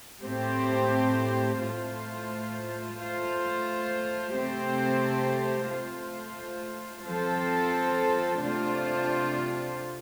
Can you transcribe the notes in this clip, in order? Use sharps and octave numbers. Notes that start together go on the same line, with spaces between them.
A2 A3 C4 G4 C5
A2 A3 F4 C5
A3 F4 C5
C3 A3 C4 G4 C5
A3 F4 C5
F3 C4 F4 A4 C5
C3 A3 D4 F4 C5